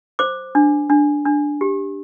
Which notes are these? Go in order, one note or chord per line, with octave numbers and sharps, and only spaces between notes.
C5 D6
D4
D4
D4
G4